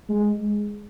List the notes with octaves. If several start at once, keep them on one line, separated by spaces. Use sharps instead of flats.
G#3